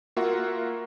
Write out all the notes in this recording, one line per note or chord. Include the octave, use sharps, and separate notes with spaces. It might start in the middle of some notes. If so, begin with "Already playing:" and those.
A#3 F4 F#4 A#4 E5 F#5